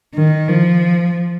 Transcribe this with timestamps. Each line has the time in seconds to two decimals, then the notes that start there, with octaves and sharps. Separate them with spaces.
0.14 D#3
0.49 F3